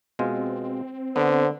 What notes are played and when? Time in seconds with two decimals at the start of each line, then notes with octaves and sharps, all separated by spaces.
0.19 B2 G#3 C4 F4
1.16 D3 B3 C5